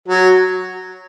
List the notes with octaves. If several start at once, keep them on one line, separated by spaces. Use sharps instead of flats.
F#3